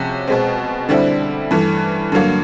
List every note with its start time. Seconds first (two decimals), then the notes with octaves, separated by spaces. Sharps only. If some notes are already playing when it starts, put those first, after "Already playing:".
Already playing: C3 F3 G#3 C#4 F#4
0.28 B2 G#3 C4
0.89 D3 G3 C4 E4
1.51 G2 E3 A3
2.12 G2 D3 F#3 A#3